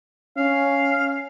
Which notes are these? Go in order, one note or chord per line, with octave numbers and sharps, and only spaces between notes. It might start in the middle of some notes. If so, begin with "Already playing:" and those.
C#4 F5